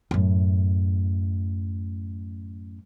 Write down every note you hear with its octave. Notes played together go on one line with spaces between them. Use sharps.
F#2 A2